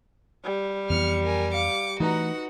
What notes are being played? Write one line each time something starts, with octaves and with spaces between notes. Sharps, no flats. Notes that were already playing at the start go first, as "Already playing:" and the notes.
G3
F2 E3 B3 F6 C#7
A#4 G#5
F5 D6 C#7
E3 A3 D#4 F#4 B4 F#5 A#5